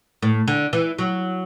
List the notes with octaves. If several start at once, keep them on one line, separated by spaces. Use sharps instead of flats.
A2
D3
E3
F#3